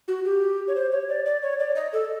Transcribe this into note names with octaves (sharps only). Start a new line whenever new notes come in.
F#4
G4
C#5
C5
C#5
D5
D5
C#5
D5
D#5
A4